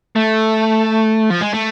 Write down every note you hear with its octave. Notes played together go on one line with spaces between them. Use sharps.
A3
F3
G#3
A3